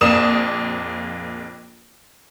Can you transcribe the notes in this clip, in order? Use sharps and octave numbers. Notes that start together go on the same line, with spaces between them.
A#1 F2 A#3 D#6 E7